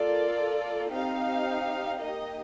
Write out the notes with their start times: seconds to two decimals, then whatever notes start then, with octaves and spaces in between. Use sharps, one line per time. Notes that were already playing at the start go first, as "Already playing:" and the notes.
Already playing: A#3 F4 A4 D5
0.91 C4 D#4 G4 F5
2.01 A#3 D#4 G4 D#5